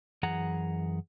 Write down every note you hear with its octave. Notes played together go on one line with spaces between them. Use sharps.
F#2 E3 G#4 F#5 A#5